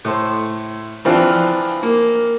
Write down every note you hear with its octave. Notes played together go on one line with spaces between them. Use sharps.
A2 C5
E3 F3 C4 D4 F4
A#3